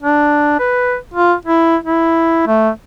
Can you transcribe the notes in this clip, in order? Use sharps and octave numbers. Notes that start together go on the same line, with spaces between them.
D4
B4
F4
E4
E4
A3